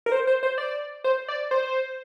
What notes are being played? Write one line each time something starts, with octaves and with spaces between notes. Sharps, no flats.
A#4
C5
C5
C5
D5
C5
D5
C5